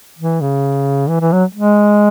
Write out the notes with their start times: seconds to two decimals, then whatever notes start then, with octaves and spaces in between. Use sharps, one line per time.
0.18 E3
0.41 C#3
1.09 E3
1.21 E3
1.32 F#3
1.55 G#3